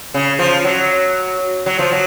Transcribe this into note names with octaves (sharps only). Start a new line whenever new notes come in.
C#3
F3
F#3
F#3
F3
F#3